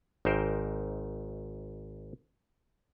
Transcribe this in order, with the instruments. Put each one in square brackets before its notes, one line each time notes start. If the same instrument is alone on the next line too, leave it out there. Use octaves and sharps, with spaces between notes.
[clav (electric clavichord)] G#1 G#2 D#4 A#4 C5 G5